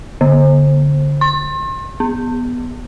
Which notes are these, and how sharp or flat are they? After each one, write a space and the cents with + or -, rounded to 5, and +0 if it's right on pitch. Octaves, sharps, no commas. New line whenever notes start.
D3 -25
C6 +40
B3 -5